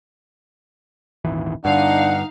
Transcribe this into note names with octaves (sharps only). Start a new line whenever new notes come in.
D#1 G#1 E3
G2 D3 D4 D#4 F5 F#5